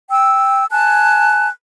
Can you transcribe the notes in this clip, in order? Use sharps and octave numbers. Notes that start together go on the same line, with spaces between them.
G5 E6
G#5 A5 F#6